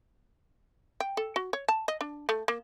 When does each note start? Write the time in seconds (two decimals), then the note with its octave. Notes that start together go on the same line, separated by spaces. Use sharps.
1.00 G5
1.17 A4
1.36 F#4
1.53 C#5
1.68 A5
1.88 D#5
2.01 D4
2.29 A3
2.48 A#3